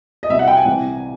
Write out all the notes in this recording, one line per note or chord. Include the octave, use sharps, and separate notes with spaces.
D#5
C2 B2 E5
F#5
G5
G#5
C2 C3 E3